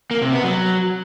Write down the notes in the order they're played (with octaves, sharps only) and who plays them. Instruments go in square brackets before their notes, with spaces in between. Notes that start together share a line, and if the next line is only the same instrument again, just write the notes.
[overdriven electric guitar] A#3
C3
B3
F#3